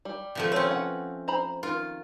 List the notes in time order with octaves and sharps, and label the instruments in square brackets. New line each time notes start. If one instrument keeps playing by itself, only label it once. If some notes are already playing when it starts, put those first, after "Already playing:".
[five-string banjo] G3
[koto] C3 F3 A3
[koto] C4 C#4 [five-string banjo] C5 C#5
[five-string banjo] B4 F#5
C5 A#5 B5
[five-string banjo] D#3 A#4 [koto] F4